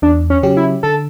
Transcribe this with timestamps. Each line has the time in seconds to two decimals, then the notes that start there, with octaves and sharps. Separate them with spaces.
0.02 E2 D4
0.30 C#4
0.43 C#3 F#3 C#4 G4
0.57 E4
0.83 D3 A4